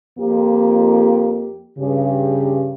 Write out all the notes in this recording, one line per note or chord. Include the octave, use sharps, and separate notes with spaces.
F2 A#3 G4
G2 C#3 G4